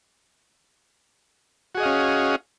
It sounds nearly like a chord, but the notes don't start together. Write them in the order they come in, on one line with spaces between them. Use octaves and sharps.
F#4 G#4 D#5 F5 C#4